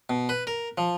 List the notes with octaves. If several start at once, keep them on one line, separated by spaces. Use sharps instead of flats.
B2
B4
A#4
F3